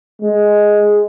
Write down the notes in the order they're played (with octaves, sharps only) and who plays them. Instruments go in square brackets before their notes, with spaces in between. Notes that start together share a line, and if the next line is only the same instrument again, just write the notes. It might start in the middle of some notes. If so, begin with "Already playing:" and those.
[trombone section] G#3